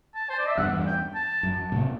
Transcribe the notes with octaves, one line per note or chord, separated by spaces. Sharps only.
A5
C5
D5
E5
E2 G2 F#5
G5
A5
F#2
A2 C3